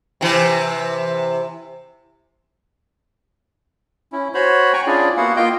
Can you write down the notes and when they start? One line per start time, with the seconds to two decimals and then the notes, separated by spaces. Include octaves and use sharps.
0.21 C3 E3
4.12 C#4 E4
4.34 F#4 C5 C#5 B5
4.73 G5 G#5 A#5 C#6
4.87 C#4 D4 E4 F4 G#4 D5
5.17 A#3 B3 E4 F#4 F5 F#5
5.36 A#3 F4 D#5 F5 G5 G6